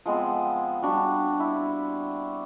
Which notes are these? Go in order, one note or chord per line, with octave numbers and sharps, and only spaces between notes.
F3 G#3 B3 C4
G3 D4 F#4
E4